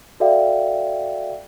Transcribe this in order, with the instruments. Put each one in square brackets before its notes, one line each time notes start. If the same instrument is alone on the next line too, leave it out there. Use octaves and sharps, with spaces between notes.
[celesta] F#4 A4 D5 E5 F5 G5